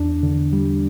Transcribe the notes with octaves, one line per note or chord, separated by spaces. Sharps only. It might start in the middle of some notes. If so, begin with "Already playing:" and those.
Already playing: E2 D4
D3
G3